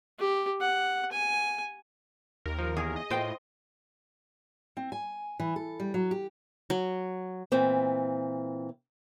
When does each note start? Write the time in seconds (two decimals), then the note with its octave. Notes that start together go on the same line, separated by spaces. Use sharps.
0.19 G4
0.61 F#5
1.12 G#5
2.46 D#2 A#4
2.59 F3
2.77 E2 G#4
2.96 D#5
3.10 A2 F4 C5 G5
4.77 C4
4.92 G#5
5.40 E3
5.56 A4
5.80 G3
5.94 F#3
6.11 G4
6.70 F#3
7.52 A#2 E3 C4